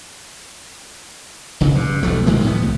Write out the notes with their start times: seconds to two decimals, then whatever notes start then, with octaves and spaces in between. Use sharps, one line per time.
1.60 F1 C#3
1.75 G2
2.03 E1 B1 F3 A3
2.26 C2 D#3 G#3 A#3
2.44 A2 F3 B3
2.62 C2